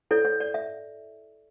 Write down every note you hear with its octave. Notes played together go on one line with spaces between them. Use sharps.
E4 A4 C#5 D5
C#5
D5
E5